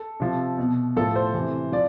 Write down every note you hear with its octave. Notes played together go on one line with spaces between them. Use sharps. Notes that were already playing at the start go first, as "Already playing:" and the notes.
Already playing: A4
C3 F3
B2
A2 F3 A4
C5
C3 E3
F3 D5